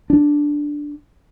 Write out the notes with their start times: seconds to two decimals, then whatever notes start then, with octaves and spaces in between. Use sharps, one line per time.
0.10 D4